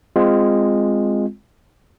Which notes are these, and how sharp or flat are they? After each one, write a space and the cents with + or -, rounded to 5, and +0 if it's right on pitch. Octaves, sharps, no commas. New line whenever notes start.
G#3 -10 C4 -5 F4 +0